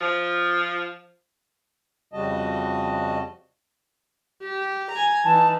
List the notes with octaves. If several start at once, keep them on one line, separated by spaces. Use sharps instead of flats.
F3
F2 C#3 G3 F#4 D#5 A5
G4
G#5 A#5
E3 D#4 A5